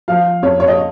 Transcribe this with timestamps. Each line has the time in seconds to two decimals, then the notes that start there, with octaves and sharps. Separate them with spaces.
0.08 F3 F5
0.43 F2 C#5
0.60 C#5
0.68 D#5